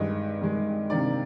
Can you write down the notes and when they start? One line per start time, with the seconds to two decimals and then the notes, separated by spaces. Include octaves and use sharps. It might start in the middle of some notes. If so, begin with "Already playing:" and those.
Already playing: G2 D#3 G#3 D#5
0.41 G2 D#3 G#3
0.90 C3 D#3 A#3 D4 D5